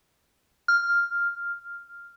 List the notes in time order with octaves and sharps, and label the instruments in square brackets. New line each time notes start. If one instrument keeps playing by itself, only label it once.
[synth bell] F6